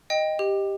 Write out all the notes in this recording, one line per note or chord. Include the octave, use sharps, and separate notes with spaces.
D#5 G5
G4